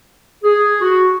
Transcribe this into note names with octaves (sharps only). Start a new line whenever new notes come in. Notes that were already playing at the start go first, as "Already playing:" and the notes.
G#4
F#4